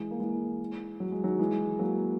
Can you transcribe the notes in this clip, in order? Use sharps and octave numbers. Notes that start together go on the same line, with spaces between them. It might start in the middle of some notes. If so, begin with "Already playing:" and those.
Already playing: E3 G#3
A#3
E3 G#3
F#3
G#3
D#3 F#3
E3 G#3
F#3 A#3